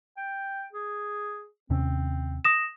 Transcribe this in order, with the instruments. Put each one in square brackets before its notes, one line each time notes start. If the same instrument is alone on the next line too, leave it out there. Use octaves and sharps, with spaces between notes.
[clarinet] G5
G#4
[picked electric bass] D#2 C3 C#4 [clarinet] C4
[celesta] D#6 A#6 E7